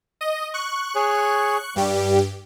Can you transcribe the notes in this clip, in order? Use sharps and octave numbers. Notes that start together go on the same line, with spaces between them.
D#5
C#6 F#6
G#4 C#5
G2 G3 G4